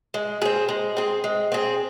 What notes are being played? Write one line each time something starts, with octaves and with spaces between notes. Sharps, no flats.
G#3
C4 G#4
G#3
C4 G#4
G#3
C4 G#4